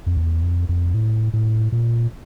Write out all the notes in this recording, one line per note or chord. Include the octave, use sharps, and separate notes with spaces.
F2
E2
F2
F2
A2
A2
A#2